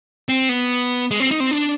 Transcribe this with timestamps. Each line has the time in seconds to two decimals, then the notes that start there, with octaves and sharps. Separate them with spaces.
0.29 C4
0.49 B3
1.11 G#3
1.20 C4
1.31 D#4
1.40 C4
1.51 D4